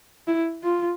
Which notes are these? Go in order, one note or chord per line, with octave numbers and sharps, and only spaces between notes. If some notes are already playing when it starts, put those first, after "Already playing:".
E4
F4